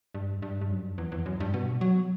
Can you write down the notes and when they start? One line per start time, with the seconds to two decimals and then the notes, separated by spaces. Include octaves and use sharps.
0.15 G2
0.42 G2
0.61 G2
0.70 F#2
0.98 E2
1.12 E2
1.26 F#2
1.40 G2
1.54 B2
1.81 F#3